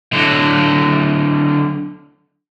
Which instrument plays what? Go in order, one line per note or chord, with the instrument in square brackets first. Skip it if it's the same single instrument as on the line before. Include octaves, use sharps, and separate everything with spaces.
[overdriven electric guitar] D3 F#3